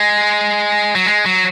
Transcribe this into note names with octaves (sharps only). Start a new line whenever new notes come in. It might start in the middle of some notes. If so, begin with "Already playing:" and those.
Already playing: G#3
F#3
G#3
F#3